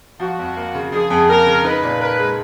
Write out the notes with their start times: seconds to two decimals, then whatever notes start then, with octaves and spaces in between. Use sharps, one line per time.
0.20 F3 F#4
0.39 F2
0.57 A#3
0.75 C#3
0.92 F3 G#4
1.10 F2
1.29 A#3 A#4
1.47 C#3
1.64 D#4 B4
1.82 A#2
2.00 A#4 B4
2.19 G#3